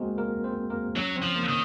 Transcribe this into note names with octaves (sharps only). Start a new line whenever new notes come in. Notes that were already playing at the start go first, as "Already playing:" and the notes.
Already playing: G#3 A#3 C4 F#4 G#4 A#4 C5
A#3 A#4
C4 C5
A#3 A#4
F#3 C#4 C#5
C4 C5
F3
A#3 A#4
D#3